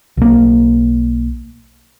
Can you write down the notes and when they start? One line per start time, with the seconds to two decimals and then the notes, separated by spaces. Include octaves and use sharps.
0.17 B1 A#3